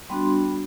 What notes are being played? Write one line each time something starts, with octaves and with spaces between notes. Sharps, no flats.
G3 B3 D4 F#4 C6